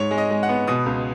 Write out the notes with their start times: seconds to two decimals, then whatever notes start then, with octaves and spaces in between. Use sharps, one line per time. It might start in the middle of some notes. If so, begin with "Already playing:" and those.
Already playing: G#2 C#5
0.11 G#3
0.18 D#5
0.31 G#3
0.43 F#5
0.49 B3
0.67 B2 D#6
0.86 C#2